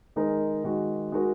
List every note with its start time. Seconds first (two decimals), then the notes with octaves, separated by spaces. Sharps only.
0.16 D#3 G#3 D#4 A#4
0.64 D#3 G#3 F#4
1.12 G#3 D#4 F#4 A#4